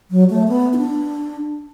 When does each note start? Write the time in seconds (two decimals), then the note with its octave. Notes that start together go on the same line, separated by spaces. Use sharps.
0.11 F#3
0.30 A3
0.48 B3
0.73 E4
0.77 D4